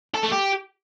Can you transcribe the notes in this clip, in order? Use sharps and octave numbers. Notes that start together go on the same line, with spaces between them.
A4
A3
G4